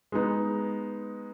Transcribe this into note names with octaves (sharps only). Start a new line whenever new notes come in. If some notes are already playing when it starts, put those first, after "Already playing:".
G#3 B3 D#4